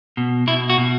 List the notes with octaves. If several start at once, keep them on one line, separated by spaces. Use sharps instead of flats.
B2
B2 E4
F#4
B2